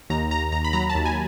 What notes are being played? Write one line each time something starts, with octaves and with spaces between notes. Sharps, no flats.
D#2 A#5
D#2 A#5
D#2 A#5
B5
F#3 A#5
A5
D#2
G#5